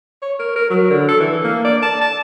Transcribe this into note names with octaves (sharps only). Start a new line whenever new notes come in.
C#5
A#4
A#4
F#3
D3
A4
E3
A#3
D5
A5
A5